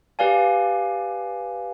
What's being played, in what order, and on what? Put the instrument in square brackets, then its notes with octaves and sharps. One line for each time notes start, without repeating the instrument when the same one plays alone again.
[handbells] G4 B4 D5 F5 G#5